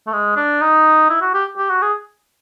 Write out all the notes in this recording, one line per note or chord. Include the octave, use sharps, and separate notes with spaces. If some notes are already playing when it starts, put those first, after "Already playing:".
A3
G#3
D4
D#4
E4
F#4
G4
G4
F#4
G#4